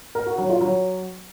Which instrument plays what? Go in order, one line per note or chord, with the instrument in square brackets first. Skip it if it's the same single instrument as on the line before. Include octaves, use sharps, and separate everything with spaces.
[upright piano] A#4
F#4
F#3
F4
F#3